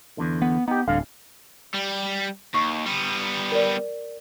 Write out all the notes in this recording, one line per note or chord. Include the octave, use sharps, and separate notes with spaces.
E2 D3
B3
B3 D#4 G4
D1 G2 D3 F5
G3
D#2 C#6
G3 B3
A#4 D5